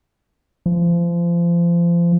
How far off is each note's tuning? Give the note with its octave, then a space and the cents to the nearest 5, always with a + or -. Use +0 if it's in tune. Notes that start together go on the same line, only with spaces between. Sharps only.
F3 -30